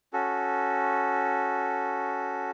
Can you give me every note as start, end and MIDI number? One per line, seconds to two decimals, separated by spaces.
0.13 2.51 61
0.13 2.51 66
0.13 2.51 69